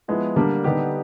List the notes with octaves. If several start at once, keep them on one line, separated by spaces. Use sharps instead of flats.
F3 G#3 B3 E4
D3 G3 A#3 D4
D3 G3 B3 D#4 G4